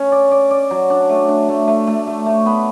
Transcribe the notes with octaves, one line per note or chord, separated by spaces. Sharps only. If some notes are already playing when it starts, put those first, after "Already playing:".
Already playing: C#4
D5
D5
D5
F#3
D4
A3
D4
A3
A3
A3
A3
A3
B3